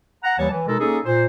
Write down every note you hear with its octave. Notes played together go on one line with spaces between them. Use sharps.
F#5 A#5
D#2 E3 G3 C#5 A5
E3
B2 G#3 D#4 A4 A#4
A#3 C#4 D#4 G#4 A4
A#2 C5